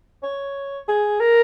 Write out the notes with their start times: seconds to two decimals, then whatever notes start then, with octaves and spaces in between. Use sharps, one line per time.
0.23 C#5
0.88 G#4
1.20 A#4